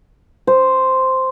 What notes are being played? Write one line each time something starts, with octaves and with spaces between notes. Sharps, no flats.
C5